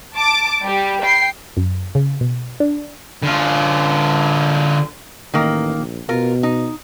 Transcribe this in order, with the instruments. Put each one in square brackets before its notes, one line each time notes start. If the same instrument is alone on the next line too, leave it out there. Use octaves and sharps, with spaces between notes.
[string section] A5 D6
G3 G4
G5 C7
[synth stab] F#2
C#3
B2
D4
[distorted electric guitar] D3 F4
[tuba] A1 [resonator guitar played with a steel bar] D#3 A#3
[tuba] A#1
[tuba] B2 [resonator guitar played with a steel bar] F4 A#4
[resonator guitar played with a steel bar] D#4